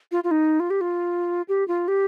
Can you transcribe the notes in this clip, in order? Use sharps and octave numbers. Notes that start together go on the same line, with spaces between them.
F4
F4
D#4
F4
G4
F4
G4
F4
G4